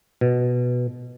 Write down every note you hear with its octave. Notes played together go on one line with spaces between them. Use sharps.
B2